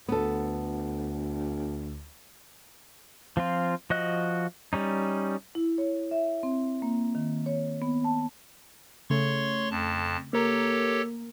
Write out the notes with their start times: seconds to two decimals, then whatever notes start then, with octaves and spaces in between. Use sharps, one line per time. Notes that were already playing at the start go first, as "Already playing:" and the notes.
0.09 D2 B3 A4
3.37 F3 C4 F4
3.90 F3 F#4 D#5 F#6
4.73 G3 C#4 D#4
5.55 E4
5.78 C#5
6.11 E5
6.43 C4
6.82 A#3
7.15 D#3
7.46 C#5
7.82 B3
8.04 A5
9.10 C#3 A3 C#5 C6 C#6
9.70 F2 A5
10.33 A#3 G4 A4 A#4 C#5